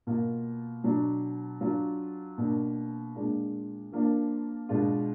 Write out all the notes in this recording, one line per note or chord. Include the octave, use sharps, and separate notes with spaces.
B2 A#3 F4
B2 F#3 D4
F#3 D4 F4
B2 A#3 D4
A#2 G#3 D4 F4
F3 A#3 D4 F4
B2 G#3 D4 F4